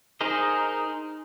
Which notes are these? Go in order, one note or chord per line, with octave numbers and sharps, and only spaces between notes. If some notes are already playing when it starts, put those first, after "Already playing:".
D#4 G#4 A#4 C5 D#5